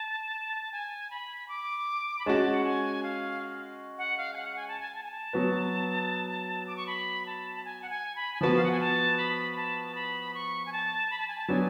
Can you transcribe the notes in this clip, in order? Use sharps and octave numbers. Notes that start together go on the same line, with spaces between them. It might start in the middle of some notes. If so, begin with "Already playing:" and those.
Already playing: A5
G#5
B5
D6
B5
G#3 C#4 F#4 A5
F#5
G#5
F5
F#5
F5
G#5
F#5
G#5
A5
G#5
A5
G#5
A5
F#3 B3 F#4 B4
D6
C#6
B5
A5
A5
G#5
F#5
G#5
B5
G#5
F3 B3 F#4 B4 A5
F5
F#5
G#5
A5
B5
A5
B5
C#6
G#5
A5
B5
A5
G#5
A5
F#3 B3 D4 G#5